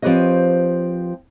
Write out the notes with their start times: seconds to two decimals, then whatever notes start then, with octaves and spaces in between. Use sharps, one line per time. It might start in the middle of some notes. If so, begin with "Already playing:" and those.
0.02 F3 C4 G4 B4 C#5 D#5